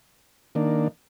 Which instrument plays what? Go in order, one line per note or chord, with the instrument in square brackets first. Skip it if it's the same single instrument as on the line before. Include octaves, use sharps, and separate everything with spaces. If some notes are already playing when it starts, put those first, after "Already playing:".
[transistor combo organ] D#3 A#3 D4